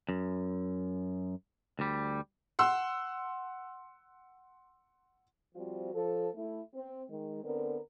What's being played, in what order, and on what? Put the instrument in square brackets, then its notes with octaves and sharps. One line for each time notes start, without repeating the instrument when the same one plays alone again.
[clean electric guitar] F#2
D2 G3
[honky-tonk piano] F#5 C6 E6
[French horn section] F3 G3 C4 F4 F#4
F3 A4
A3 E4
C4
D#3 G#3
D3 B3 C4 A#4